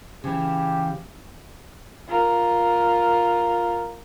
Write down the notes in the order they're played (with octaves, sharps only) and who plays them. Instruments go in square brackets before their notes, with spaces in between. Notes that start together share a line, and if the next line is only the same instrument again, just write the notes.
[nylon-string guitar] C#3 E3 [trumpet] G4
[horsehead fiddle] F4 A#4